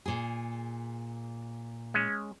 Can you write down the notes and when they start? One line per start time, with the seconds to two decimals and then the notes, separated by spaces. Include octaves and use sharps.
0.06 A#2 G#4
1.94 G#3 C#4